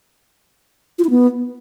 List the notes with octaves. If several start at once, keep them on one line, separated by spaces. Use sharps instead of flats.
F4
E4
B3